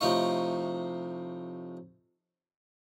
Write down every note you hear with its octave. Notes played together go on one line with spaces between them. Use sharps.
A2 C3 F3 D#4 F5 C#6